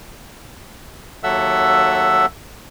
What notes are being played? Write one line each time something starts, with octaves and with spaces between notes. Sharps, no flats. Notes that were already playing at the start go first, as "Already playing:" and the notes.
D#2 F#3 A4 E5 F#5 E6